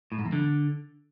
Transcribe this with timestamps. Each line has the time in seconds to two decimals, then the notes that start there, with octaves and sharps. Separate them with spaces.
0.12 A2
0.19 G#2
0.26 E2
0.32 D3